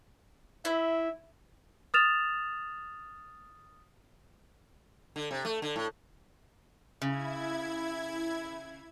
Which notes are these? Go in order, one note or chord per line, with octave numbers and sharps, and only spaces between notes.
E4 E5
D#6 F6 A6 E7 F7
D3
C3
A3
D3
A2
C#3 E4 G#6